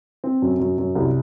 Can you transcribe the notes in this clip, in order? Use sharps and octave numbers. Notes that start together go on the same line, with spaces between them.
C4
F#2
F#2
F#2
C2